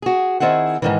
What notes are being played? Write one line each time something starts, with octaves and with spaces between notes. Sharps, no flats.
F#4 G#4
D#3 C4 E4 G#4 F#5
G#2 D#3 E3